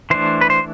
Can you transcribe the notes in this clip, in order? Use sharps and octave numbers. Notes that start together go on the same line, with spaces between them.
E3 A3 D4 C5
B4
C5